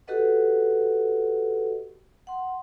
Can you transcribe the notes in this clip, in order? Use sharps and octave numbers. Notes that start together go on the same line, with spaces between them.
F#4 G4 A4 B4 D#5 F#5
F#5 C6